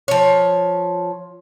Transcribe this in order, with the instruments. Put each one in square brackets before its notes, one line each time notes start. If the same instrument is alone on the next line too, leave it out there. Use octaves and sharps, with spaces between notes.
[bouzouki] F3 C#5